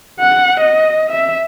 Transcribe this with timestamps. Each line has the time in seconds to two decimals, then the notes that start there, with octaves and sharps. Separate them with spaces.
0.19 F#5
0.60 D#5
1.10 E5